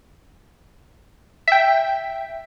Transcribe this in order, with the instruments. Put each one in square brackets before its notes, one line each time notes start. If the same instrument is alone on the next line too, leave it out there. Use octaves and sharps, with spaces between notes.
[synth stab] E5 G5